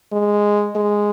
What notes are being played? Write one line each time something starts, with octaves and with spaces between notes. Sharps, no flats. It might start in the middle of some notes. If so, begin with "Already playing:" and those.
G#3
G#3